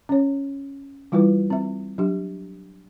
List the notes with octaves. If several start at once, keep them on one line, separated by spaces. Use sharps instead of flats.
C#4 C#5
E3 G3 E4 F4 B4
C4 E5
F#3 D4 G4